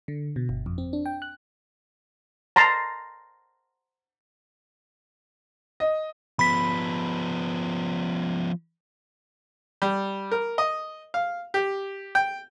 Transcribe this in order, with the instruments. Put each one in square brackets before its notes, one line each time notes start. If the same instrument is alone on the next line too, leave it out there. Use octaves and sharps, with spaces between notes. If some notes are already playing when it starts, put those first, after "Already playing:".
[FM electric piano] D3
B2
G1
F2
C4
D4
G5
F#6
[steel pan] A5 A#5 C6
[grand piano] D#5
[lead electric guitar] F3 B3 [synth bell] B5 B6
[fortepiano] G3
A#4
D#5
F5
G4
G5